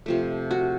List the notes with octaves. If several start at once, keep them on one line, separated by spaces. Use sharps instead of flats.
C3 F3 A3
F#4